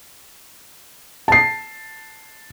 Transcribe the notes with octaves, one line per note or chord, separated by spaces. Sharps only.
A5 C7